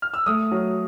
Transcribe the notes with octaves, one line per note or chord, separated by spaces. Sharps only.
F6
E6
A3 D#6
F#3